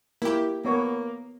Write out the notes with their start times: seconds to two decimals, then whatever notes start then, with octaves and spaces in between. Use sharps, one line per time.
0.22 A#3 E4 G4
0.65 A#3 B3 C#5